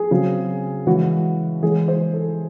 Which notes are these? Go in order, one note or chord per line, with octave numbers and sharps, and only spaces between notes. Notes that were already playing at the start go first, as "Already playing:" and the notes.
Already playing: G#4
C#3 F#3 C4
C#3 E3 G#3 F#4
E3 G#3 C#4 G#4
C5
A4